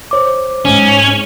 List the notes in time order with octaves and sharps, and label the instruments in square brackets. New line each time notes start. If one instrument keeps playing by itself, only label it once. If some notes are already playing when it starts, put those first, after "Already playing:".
[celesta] C5 C#5 D6
[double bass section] G#2 [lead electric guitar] C#4